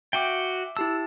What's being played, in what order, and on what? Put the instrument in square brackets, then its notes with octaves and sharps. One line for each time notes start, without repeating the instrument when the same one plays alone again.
[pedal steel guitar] F#4 G5 [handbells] E5 D6
[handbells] E4 G4 A5 [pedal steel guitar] E6